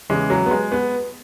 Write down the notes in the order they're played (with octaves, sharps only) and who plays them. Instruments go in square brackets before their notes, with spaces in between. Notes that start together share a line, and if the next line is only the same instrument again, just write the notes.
[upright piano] E2 C#3 E3 G#3
F#3
B3
G#3
B3